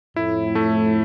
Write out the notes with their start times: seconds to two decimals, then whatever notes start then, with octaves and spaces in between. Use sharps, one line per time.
0.16 F2 A2 E4
0.55 A3